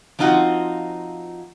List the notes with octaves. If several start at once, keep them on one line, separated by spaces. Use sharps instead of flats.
F3 C4 D#4 F4 F#4